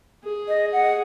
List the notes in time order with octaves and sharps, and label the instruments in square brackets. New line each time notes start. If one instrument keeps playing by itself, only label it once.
[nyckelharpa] G#4
[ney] D#5
F#5